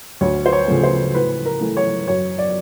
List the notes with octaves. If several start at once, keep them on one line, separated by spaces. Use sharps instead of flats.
D2 C#5
C5
C#5
C#3 F3 A3
C5
A2 B4
A#4
E3 A3
C#5
F#2 C#5
D5